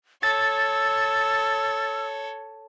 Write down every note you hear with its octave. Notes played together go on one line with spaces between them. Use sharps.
A4 C#5 E6 A6